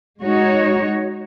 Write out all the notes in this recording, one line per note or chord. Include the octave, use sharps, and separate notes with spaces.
G#3 D#4 F#4 C#5